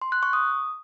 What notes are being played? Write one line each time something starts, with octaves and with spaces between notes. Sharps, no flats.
C6
F#6
C#6
D#6